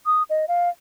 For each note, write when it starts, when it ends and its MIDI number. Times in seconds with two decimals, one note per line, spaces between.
0.06 0.23 87
0.30 0.45 75
0.48 0.69 77